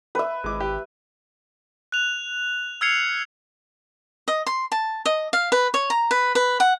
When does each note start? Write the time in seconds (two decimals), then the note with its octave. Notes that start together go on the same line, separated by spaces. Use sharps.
0.15 B4 E5
0.44 G#1 G#3 D6
0.60 G4
1.92 F#6 F7
2.81 E6 F6 G#6 C7 C#7 F7
4.28 D#5
4.46 C6
4.72 A5
5.06 D#5
5.33 F5
5.52 B4
5.74 C#5
5.90 A#5
6.11 B4
6.35 B4
6.60 F#5